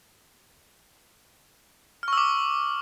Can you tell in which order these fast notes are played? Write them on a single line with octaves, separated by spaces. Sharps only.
F6 C#6 E6 D6